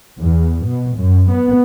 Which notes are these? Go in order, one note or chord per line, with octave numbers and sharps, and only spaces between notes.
E2
B2
F#2
B3